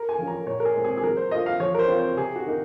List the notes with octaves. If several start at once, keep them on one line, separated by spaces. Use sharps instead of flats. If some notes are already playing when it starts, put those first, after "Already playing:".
Already playing: A#4
G#5
F3 A#3 C#4
A#5
A#2 C#5
A#4
G#4
G#3 C4
G#4
G#4
F#3 A#4
C5
A#3 F4 D#5
F5
F3 C#5
A#4
C5
C4 F4
C5
C3 G#4
F#4
D#3 A#3 D#4